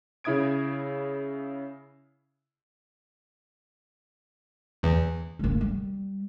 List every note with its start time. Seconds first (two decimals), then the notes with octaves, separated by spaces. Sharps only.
0.24 C#3 E4 E5 D#6 G#6 D7
4.83 E2
5.39 D3 A#3
5.61 G3